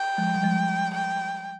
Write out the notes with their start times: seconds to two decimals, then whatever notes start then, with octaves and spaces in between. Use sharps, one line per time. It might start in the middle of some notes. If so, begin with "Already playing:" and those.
Already playing: G5
0.18 F3 G#3
0.35 G3
0.43 F3 G#3
0.94 G5